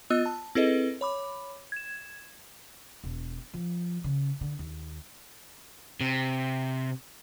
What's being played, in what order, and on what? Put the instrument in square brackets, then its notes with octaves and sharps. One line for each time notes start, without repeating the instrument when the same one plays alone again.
[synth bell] B3 F4 D#5 E6 F#6
A5
C4 E4 G#4 A4 B4 D#5
C#5 B5 D6
G#6 E7
[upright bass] E1
F3
C#3
D3
D#2
[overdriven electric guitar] C3